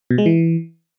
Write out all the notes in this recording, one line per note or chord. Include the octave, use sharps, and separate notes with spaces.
B2
G#3
E3